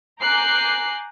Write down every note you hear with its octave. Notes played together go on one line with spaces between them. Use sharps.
G#5 A#5 D6 F#6 G6 C7